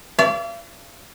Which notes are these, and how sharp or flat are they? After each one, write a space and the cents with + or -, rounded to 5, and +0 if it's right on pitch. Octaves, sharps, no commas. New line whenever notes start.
D5 -35 F5 -45